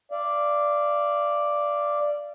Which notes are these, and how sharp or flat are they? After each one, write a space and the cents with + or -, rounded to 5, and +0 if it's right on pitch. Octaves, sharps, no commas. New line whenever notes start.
D5 +0 F5 -35